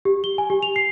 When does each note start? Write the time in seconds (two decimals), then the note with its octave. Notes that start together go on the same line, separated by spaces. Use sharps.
0.05 G4
0.24 G7
0.38 G#5
0.50 G4
0.63 F7
0.76 C7